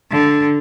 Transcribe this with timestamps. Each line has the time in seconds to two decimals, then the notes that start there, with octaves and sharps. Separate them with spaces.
0.11 D3